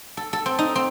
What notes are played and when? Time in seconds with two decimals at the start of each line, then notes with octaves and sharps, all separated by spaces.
0.17 A4
0.33 A4
0.46 C4
0.59 D#4
0.76 C4